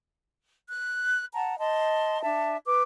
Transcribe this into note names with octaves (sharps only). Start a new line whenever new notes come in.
F#6
F#5 A5 A#5
D#5 A5 C6
D4 E5 A5
B4 D6